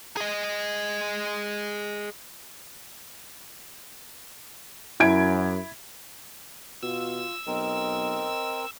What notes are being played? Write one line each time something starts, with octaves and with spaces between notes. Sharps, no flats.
G#4 D#5
F#2 E4 G#6 D7
B2 F4 E6
B1 C4 A#4 D#5